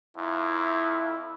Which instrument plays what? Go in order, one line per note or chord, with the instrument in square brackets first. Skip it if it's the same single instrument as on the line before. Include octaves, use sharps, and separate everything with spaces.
[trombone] F2 [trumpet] E4